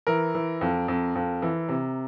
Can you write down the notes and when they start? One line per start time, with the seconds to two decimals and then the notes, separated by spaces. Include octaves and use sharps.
0.07 E3 A#4
0.35 E3
0.61 F2
0.88 F2
1.15 F2
1.42 E3
1.69 C3